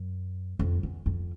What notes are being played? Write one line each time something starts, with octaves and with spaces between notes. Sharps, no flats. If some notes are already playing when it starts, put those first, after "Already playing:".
Already playing: F#2
F2
E2
F2